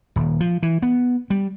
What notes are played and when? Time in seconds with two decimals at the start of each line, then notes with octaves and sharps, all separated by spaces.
0.16 D#1
0.40 F3
0.63 E3
0.82 B3
1.30 G3